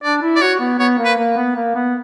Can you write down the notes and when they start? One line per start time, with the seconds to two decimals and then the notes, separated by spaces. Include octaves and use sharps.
0.03 D4 D5
0.22 E4
0.36 D5
0.42 F#4 C#5
0.60 B3
0.79 B3 C#5
0.99 A#3
1.05 B4
1.18 A#3
1.37 B3
1.56 A#3
1.75 B3